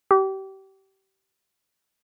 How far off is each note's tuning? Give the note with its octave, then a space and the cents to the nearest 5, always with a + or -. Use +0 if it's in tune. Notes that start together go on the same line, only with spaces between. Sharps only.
G4 -30